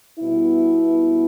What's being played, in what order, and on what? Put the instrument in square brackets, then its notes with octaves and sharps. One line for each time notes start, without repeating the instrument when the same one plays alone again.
[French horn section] B2 G3 B3 E4